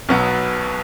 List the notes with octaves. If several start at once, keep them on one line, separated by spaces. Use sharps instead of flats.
B1 B2 F#3 B3